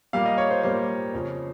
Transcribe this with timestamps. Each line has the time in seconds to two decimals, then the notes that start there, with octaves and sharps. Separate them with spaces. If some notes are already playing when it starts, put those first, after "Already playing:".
0.13 A#2 G3 A#3 F5
0.26 D#5
0.38 C#5
0.51 C5
0.63 A#2 G3 A#3 C5
1.13 F2 C#3 F3